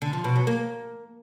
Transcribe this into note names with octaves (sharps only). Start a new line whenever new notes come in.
D3
F3
B2
F#3
A#3